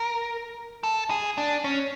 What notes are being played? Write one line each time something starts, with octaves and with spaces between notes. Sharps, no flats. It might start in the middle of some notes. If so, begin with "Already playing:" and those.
Already playing: A#4
A4
G#4
D4
C#4